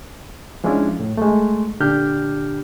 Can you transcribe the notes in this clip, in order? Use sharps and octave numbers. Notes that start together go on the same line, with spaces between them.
F3 G#3 C#4 D4 E4 F4
A2
G#3 A3
A#2 D3 D4 G4 F6 G6